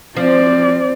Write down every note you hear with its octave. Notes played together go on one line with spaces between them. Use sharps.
F3 C4 D5